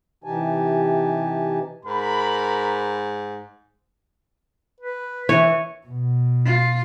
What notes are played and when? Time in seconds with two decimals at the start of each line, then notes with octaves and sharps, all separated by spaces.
0.24 C3 E3 D#4 G4 G#5 A5
1.86 G#2 A#4 B5
4.80 B4
5.29 E3 C#5
5.87 B2
6.46 F4